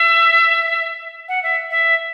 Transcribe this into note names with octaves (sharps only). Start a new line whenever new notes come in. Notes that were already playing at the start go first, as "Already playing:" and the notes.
Already playing: E5
F#5
E5
E5